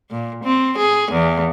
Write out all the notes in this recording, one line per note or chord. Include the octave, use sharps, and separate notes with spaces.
A#2
C4
G#4
E2